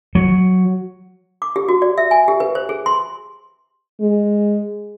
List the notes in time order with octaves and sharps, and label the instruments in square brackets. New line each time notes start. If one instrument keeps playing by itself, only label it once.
[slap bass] F#3
[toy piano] D6
G4
F#4
D5
E5
G#5
G4
B4
C5
G#4
C6
[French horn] G#3